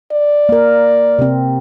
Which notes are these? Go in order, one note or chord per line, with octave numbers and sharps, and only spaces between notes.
D5
A#3 A#4
C3 C4